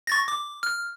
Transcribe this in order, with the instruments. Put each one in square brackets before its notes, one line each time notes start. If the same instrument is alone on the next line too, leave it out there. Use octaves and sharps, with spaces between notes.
[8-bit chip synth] C#6 A6 A#6
D6
F6